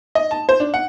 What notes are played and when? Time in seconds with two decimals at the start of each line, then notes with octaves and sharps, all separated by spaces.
0.15 D#5
0.31 A5
0.49 C5
0.60 D4
0.74 F#5